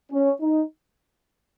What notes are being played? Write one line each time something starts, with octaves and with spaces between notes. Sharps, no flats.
C#4
D#4